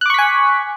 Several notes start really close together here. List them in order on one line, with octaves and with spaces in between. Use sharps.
F#6 D6 C#6 B6 G#5